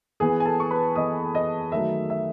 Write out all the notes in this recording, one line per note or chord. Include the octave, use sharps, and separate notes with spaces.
E3 B3 G#4 G#5
G#5
A4 A5
C#6
B4 B5
E3 B3 D#5 D#6
D#5 D#6
D#3 F#3 A3 E5
E5